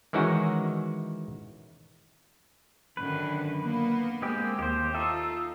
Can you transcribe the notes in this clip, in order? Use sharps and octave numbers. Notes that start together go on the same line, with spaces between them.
D#3 E3 G#3 C#4 D#4 F#4
F#2 D3 D#3 B4
A#3 B3
G#3 A#3 C4 G4
D#2 G4 C5
D#4 F4 A4 E5